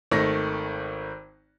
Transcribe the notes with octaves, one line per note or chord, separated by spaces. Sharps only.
G#1 D#3 A3 A#6